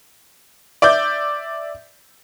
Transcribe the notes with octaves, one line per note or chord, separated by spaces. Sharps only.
D5 E5 D6 G6